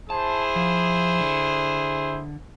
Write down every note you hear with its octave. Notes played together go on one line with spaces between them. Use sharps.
E4 G#4 C5 A5
F3
D3